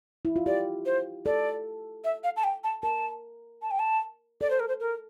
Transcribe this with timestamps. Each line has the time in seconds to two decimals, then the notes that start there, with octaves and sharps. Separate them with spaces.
0.25 E4
0.36 F4
0.46 G4 D5
0.86 C5
1.26 A4 D5
2.04 E5
2.24 F5
2.37 A5
2.44 G5
2.64 A5
2.83 A#4 A5
3.62 A5
3.71 G5
3.79 A5
4.41 A4 D5
4.50 C5
4.60 A#4
4.68 C5
4.80 A#4